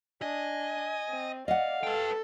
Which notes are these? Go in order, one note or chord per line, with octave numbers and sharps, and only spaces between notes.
D4 D#5 G#5
C4
D5 D#5 F5 F#5
A4 B4 G5